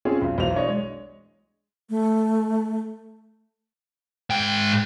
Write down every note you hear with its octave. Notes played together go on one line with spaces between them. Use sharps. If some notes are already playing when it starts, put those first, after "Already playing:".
C4 C#4 F4 G#4
B1
B1 E3 F#3 C5 F7
D4 C#5 D#5
G#3
A3
G#2 G5